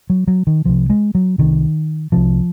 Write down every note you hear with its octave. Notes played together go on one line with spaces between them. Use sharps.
F#3
F#3
D#3
C2 C3 F3
G#3
F#3
C2 C3 D#3
C2 C3 F3